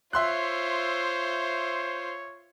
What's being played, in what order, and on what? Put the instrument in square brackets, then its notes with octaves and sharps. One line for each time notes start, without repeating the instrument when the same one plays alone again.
[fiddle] F4 [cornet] C5 [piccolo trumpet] C#5 [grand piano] E5 C6 F#6